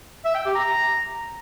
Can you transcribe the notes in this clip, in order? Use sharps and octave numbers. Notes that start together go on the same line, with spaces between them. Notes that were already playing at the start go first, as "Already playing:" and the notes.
E5
G5
G4
A#5